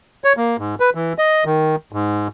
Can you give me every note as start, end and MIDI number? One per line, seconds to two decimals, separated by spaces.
0.24 0.33 73
0.37 0.57 58
0.58 0.75 44
0.80 0.90 71
0.95 1.13 52
1.18 1.44 75
1.45 1.76 51
1.93 2.28 44